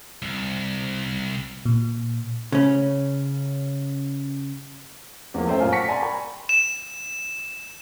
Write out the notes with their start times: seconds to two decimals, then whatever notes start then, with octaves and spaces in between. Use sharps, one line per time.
0.22 C2
1.66 A#2
2.52 C#3 C#4
5.34 E2 F3 A#3
5.47 A3 C#4 C5 E5 G5
5.60 F#2 A#2 F4 A#4 G#5 F6
5.72 F#5 A5 C#6 A#6 B6 C#7
5.88 D5 G#5 A#5 C6
6.02 G5 G#5 B5 C#6
6.49 E7